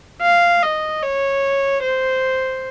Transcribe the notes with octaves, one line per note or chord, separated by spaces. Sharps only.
F5
D#5
C#5
C5